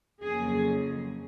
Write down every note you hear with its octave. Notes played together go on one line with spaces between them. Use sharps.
F2 C#3 F#3 A#3 G#4